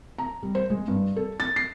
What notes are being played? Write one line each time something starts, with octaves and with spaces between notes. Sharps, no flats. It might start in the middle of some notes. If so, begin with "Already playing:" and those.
A#5
G3
C5
G#3
G2
A4
A6
C7